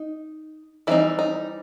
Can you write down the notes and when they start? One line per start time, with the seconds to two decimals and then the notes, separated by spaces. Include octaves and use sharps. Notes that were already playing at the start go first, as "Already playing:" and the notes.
Already playing: D#4
0.87 E3 G3 C4 D#4 E4
1.19 D#4